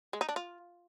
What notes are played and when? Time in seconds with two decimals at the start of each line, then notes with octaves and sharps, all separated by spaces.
0.13 G#3
0.21 D#4
0.29 D4
0.36 F4